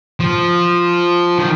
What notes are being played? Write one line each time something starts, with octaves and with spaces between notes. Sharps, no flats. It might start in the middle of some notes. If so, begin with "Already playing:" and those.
F3
D#3